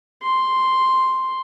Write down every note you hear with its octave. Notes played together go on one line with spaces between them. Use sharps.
C6